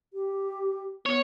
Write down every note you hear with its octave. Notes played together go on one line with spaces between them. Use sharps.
G4
B3 C#5